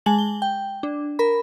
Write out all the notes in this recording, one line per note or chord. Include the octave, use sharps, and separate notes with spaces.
G#3 G#5 A5 F#7
G7
G5
D4
A#4 B5